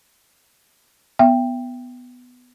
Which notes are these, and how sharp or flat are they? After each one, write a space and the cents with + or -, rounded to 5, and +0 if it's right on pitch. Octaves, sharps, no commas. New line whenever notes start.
B3 +10 E5 +35 G5 +5